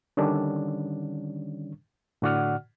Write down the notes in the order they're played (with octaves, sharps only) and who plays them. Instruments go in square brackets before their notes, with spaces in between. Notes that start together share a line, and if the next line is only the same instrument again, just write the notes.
[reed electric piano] D3 D#3 G3 C#4 D4
A2 D3 F#4 D5 F#5 F6